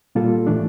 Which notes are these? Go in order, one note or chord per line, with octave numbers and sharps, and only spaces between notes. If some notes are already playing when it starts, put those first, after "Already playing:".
A#2 G3 A#3 F4 A4
A2 E3 A3 D4